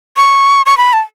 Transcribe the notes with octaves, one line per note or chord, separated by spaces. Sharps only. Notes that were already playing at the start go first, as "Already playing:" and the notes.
C#6
C#6
B5
A5